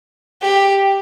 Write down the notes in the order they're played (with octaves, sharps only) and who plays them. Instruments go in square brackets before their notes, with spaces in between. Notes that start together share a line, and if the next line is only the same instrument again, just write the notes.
[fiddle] G4